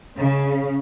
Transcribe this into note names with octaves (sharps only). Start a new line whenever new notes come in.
C#3